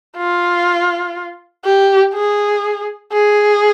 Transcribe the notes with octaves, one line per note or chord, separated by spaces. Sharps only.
F4
G4
G#4
G#4